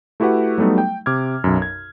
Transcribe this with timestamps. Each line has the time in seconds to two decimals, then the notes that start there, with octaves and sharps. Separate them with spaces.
0.20 A3 E4 F#4 G4 B4 F#5
0.58 F#3 G3 A3 B3 D#4
0.78 G5
1.06 C3 D6 F6 G#6
1.44 B1 F#2
1.62 G#6